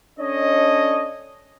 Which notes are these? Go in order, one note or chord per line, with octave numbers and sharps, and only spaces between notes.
C#4 D4 A4 C#5 D#5